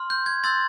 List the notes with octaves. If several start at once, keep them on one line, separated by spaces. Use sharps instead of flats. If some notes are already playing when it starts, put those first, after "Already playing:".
Already playing: C6 F6
G6
G#6
C6 E6 G6 A6